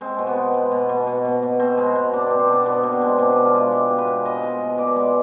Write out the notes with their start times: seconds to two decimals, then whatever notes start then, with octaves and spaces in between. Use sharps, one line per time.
0.01 G#3 C4
0.19 B2
0.27 B3
0.35 G#3
0.54 G#3
0.71 B2
0.89 B2
1.07 B2
1.25 B2
1.42 B2
1.59 B2 C4
1.77 G#3
1.95 B2
2.12 B2 D4
2.26 B2 C4
2.39 C4
2.48 B2 D4
2.66 B2 B3
2.83 B2
2.92 C4
3.01 G#3
3.18 B2 D4
3.37 B2
3.45 F4
3.55 G#3
3.72 G#3 G4
3.90 B2
3.98 B4
4.07 G#3
4.25 B2 D#5
4.42 G#3
4.60 B2
4.78 B2 D5
4.96 G#3